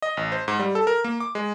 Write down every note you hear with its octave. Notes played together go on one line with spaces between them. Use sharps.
D#5
A1
C5
G#2
G3
A4
A#4
A#3
D6
G#3